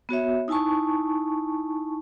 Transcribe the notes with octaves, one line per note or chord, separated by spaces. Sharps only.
B3 F#4 C#5 E5
D#4 E4 G#5 A5 C#6